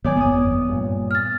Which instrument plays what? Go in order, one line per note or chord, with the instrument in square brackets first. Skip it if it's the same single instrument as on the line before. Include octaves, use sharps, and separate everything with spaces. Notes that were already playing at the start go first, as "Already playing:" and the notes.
[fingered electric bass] G#2 D#3 F#3 [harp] B3 D5 G#5 [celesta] C#5
[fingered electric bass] G1 F2 [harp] B3 D#6
[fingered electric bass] G2 A#2
[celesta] F6 A6